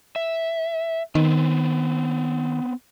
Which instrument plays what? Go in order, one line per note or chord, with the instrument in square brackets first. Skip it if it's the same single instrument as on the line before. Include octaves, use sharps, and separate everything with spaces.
[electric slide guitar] E5
[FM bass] D#3 [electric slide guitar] B3 C4